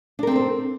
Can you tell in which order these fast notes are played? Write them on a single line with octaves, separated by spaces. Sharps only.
D4 A#4 C4 A4 C5